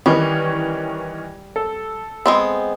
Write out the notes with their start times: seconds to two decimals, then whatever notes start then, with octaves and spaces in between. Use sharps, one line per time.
0.06 D#3 E3 G3 C#4
1.56 A4
2.26 G#3 B3 C4